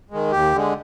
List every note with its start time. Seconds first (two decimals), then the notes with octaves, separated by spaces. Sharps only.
0.11 D#3 G#3
0.32 D#2 G4
0.53 D3 G#3